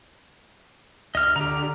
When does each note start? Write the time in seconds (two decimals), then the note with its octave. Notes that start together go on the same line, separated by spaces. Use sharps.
1.15 D2 D#5 F6
1.36 D3 G4 A#5